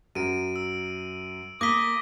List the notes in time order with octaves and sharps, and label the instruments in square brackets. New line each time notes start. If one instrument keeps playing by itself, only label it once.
[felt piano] F#2 F#3 [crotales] D7 D#7
[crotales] E6
[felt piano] A#3 [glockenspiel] D6 B6 [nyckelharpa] D#6 [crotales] A#6 G7